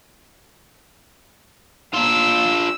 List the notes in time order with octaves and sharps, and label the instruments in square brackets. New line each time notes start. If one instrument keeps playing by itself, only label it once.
[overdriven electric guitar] D4 F4 [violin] E6